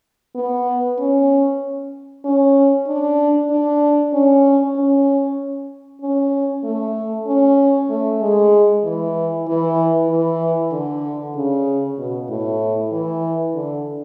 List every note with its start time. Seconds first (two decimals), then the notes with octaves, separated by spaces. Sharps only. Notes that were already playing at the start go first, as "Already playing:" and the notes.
0.36 B3
0.99 C#4
2.24 C#4
2.87 D4
3.50 D4
4.13 C#4
4.76 C#4
6.02 C#4
6.64 A3
7.27 C#4
7.90 A3
8.20 G#3
8.84 E3
9.47 E3
10.09 E3
10.72 D3
11.35 C#3
11.98 B2
12.29 A2
12.92 E3
13.54 D3